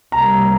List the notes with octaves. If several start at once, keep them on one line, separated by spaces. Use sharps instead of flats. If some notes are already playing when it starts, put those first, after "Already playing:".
C2 C3 G3 A#3 A#5